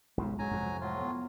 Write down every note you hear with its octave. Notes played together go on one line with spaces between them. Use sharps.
B1 G#2 C#3 G#3
G#2 F#3 G#5 A#5
F2 C3
A2 F#3 G#3 F4
B3